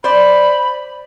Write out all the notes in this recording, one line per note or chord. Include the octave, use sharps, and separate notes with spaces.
C5 D5 B5